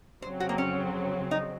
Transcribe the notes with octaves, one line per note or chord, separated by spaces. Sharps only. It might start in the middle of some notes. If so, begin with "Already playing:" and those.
F2 C#3 F#3 C4 C5
F#4
A#3
C#4
D#4